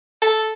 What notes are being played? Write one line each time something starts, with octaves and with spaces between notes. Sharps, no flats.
A4